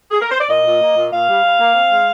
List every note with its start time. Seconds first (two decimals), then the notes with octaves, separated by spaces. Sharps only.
0.11 G#4
0.21 A#4
0.31 C5
0.40 D5
0.49 A#2 D#5
0.66 A#2
0.81 A#3
0.97 A#2
1.12 A#2 F5
1.28 G3
1.44 G3
1.60 A#3
1.75 C4
1.91 G#3